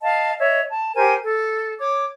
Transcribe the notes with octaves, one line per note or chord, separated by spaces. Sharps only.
D#5 F5 A5
C#5 D#5 E5
A5
G4 A#4 C5 G#5
A4
C#5 D6